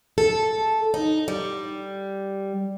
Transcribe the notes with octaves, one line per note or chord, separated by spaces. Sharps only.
A4
D#4
G3